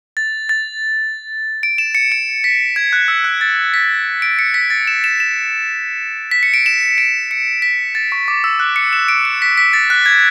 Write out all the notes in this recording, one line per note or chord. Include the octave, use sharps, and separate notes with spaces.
A6
A6
D7
E7
C#7
D7
B6
G#6
F#6
E6
F#6
A6
B6
D7
C#7
B6
A6
E7
E7
E7
B6
C#7
D7
E7
D7
C#7
B6
A6
C#6
D6
E6
F#6
C#7
E7
D7
C#7
B6
B6
A6
F#6
G#6